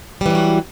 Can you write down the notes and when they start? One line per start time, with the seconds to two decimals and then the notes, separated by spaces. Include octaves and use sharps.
0.21 G3
0.26 E3
0.30 F#3
0.35 F#4